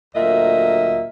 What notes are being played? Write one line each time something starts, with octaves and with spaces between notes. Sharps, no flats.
D2 A#2 F#3 D#5 E5